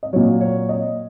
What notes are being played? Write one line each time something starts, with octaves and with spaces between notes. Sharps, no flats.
D#5
A#2 F#3 C#5
C#5
D#5